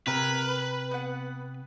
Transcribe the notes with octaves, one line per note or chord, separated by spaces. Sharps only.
C3 A#4 B4 G#5
B3 F#5